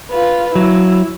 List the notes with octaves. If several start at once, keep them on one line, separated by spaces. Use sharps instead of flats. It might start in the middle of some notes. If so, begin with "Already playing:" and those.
F4 B4
F#3 E4